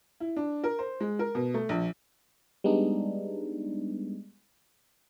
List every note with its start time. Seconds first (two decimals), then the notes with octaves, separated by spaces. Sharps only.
0.20 E4
0.36 D4
0.64 A#4
0.79 C5
1.00 G#3
1.19 A#4
1.35 B2
1.54 A3
1.69 A#1
2.64 G3 G#3 B3 D4 D#4